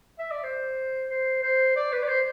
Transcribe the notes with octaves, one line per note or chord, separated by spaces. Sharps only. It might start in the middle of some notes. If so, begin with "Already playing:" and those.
E5
D5
C5
C5
C5
D5
B4
D5
C5